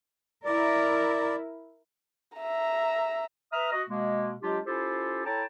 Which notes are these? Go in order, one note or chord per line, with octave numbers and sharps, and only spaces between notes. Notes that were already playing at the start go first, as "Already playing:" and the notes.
E4 A#4 D5
E5 A#5
B4 E5 A#5 D#6 F6
F#4 D#5
B2 G#3 A#3
F#3 G#3 D4 F4 G4
C#4 E4 F4 G4 A4 C5
E4 A4 C#5 G5 A5 A#5